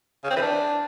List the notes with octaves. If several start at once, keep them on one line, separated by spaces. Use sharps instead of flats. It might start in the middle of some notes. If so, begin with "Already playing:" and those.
C#3
C4
E3
D4